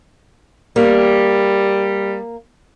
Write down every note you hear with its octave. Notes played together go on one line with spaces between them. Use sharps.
G3 A#3